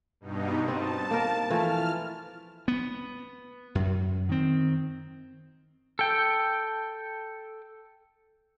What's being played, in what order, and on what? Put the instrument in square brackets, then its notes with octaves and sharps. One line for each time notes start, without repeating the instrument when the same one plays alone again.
[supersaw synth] G2 B2 D#4
[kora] C4 D#5 [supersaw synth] A5
[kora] A#3 A#4
[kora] E3 F3 A3 [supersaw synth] F6
[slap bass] B3
F#2
D#3 C4
[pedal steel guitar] A4 G5